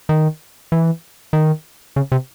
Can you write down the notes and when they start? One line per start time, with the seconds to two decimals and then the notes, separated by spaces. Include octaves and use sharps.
0.09 D#3
0.72 E3
1.33 D#3
1.96 C#3
2.12 C3